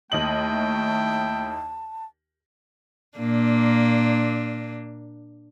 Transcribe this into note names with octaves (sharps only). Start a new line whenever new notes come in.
D#2 A3 E4 D#5 G5 A5 F#7
A#2 A#3 D4